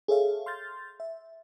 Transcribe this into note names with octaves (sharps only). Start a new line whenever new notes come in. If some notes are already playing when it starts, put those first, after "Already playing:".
G#4 A4 C#5 E5 F5
C6 F6 G6 A6
E5